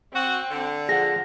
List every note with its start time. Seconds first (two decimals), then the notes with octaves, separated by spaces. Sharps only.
0.14 C4 F#4
0.50 D3
0.89 F3 G#4 F#5 A#6